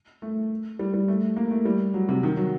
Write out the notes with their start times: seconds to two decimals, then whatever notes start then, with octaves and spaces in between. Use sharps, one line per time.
0.22 A3
0.79 G3
0.94 G3
1.08 A3
1.37 A#3
1.51 A3
1.65 G3
1.94 F#3
2.09 C3
2.23 D#3
2.37 F#3